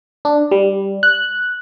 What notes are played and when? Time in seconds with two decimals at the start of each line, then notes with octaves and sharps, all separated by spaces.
0.25 D4
0.51 G3
1.03 F#6